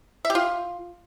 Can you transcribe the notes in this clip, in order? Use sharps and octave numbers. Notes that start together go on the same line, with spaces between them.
E5
G4
F4